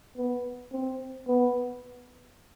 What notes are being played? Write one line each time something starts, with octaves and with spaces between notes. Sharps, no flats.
B3
C4
B3